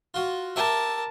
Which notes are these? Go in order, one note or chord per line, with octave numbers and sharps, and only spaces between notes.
F4 F#4
G4 A#4 E5 A5